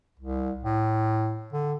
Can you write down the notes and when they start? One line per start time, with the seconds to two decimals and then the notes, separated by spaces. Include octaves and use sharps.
0.19 C2
0.63 A2
1.53 D3